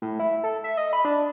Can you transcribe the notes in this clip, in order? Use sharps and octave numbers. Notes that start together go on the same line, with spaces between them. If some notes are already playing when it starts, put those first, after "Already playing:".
A2
E4
A4
E5
D#5
B5
D4